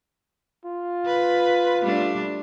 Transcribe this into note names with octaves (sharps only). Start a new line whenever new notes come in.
F4
B4
G3 A3 D4